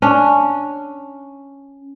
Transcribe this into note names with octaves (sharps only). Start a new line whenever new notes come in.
C#4 D4